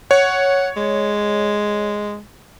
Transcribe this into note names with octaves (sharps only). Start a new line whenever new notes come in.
C#5 F#5
G#3